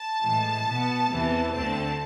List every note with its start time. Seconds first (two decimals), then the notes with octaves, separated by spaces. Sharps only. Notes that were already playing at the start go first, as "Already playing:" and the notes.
Already playing: A5
0.23 A2 E3 G#3
0.67 B2 B3
1.12 E2 C3 E3
1.54 D2 D3 A3 C4 A5